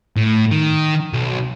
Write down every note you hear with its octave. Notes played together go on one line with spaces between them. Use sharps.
A2
D#3
B1